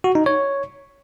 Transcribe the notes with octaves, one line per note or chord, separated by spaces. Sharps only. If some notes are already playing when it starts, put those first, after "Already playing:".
F#4
D#4
C#5